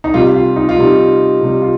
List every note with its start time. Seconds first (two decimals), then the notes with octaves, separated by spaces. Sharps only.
0.04 D#4
0.14 C3 G3 F4
0.35 F4
0.56 D#4
0.69 F4
0.77 C3 G3 D#4
1.41 C3 G3
1.62 F4